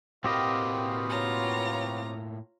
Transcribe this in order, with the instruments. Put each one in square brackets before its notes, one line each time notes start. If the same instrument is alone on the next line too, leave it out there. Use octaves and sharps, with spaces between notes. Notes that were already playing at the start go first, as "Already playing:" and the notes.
[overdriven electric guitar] A2 A#3 [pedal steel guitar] C4 G4 D#5 [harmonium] F#4 B4 F5
[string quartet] F4 C#5 A#5